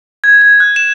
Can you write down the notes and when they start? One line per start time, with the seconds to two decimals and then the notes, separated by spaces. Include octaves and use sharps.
0.24 G#6
0.42 G#6
0.60 F#6
0.76 E7